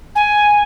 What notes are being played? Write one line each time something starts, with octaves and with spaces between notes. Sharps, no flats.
G#5